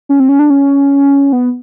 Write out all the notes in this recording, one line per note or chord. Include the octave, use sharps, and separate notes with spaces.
C#4
C4
C#4
D4
C#4
B3